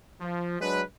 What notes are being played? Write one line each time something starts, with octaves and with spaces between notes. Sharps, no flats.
F3
F#3 G#3 D4 B4